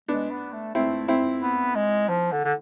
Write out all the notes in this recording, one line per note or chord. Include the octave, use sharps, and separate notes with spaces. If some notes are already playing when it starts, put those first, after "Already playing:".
G#3 B3 D4
B3
A3
A3 C4 E4
C4 E4
B3
G#3
F3
D3
D3